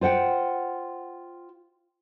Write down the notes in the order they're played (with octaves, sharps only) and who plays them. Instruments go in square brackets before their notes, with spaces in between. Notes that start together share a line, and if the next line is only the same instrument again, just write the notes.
[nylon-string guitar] F4 C5 F#5 G5